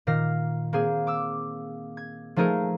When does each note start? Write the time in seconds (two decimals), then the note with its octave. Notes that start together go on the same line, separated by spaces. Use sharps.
0.07 A#2 D#3 F6 A#6 C7
0.73 A#3 C4 G#4
1.07 D6 E6
1.97 G#6
2.36 F3 A3 D#4 G#4 A#4